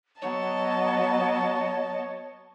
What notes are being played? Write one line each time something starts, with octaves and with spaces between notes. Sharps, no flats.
F#3 B3 C#5 D#5 A5